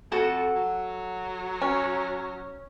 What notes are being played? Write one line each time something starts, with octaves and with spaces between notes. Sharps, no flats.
F2 F#4 A4 F#5
F#3
C#4